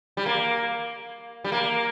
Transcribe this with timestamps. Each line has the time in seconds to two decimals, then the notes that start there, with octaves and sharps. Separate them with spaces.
0.17 G3
0.26 A#3
1.44 G3
1.52 A#3